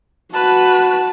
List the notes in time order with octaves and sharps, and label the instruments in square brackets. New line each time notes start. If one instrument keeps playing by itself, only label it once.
[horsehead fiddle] F#4 [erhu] B4 [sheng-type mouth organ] A5